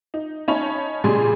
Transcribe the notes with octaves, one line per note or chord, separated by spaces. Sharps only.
D#4
C#4 D#4 C#5 A5 B5
A#2 C#3 G3 G#4 G#5 C6